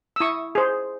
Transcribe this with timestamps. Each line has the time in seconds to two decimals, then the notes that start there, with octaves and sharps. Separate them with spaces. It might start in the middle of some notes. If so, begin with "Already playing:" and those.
0.16 E6
0.20 E4 C#6 D#6
0.55 G#4 C5